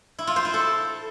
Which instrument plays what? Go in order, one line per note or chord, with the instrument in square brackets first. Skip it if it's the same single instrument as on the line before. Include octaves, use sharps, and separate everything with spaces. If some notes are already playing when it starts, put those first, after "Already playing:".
[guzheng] E4
F4
C5
E4
A4